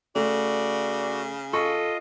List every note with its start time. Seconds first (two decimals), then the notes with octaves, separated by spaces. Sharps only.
0.16 C#3 A3 F#4 D5
1.53 F4 A4 D#5 C#6